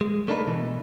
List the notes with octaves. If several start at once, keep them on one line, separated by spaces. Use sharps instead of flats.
G#3
A3 A#3 D4 D#4 A4 B4
B2 E3